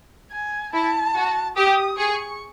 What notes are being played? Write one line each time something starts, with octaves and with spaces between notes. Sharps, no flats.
G#5
E4 A5
F#4
G4 D#6
G#4 C#6